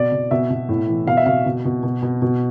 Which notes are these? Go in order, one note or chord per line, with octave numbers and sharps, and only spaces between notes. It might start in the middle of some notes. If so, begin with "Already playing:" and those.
Already playing: B2 D5
B2
B2 E5
B2
A2
E3
B2 F5
E5
B2 F5
B2
B2
B2
B2
B2